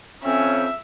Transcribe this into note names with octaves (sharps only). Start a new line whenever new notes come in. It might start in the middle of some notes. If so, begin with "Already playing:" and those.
F2 C4 C#4 E5